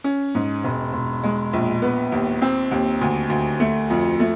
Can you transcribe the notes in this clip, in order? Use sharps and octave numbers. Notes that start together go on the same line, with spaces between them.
C#4
G#2
E1
E1
G#3
A#1
B3
D#2
C4
D#2
D2
D2
A3
F2
A3